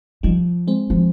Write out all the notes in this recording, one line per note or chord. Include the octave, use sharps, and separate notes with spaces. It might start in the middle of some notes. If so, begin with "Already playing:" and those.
D#3 F3 G3
G#3 C4
F3